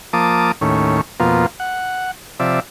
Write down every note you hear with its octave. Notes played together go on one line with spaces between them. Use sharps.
F3 A#3 A5 D6 D#6
D#2 A2 C#4
F2 B2 A#3 F4
F#5
C3 F3 D5 E5